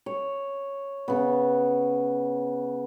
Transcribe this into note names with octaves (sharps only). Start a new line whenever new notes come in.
C#5
C#3 B3